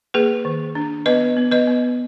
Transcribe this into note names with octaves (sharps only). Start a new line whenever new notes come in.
A#3 G#4 B4
D#3
D4
B3 B4 D#5
B3
B4 D#5
B3